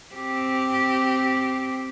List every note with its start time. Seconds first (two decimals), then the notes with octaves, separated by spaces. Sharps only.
0.14 C4 G4